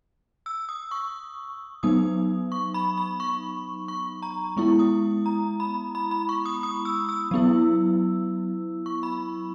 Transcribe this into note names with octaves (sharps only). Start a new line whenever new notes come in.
E6
D#6
C#6
F#3 B3 D#4 D#6
C#6
B5
B5
C#6
C#6
A#5
G#3 B3 E4 C#6
D#6
A#5
B5
B5
B5
C#6
D#6
D#6
E6
E6
F#3 B3 E4
C#6
B5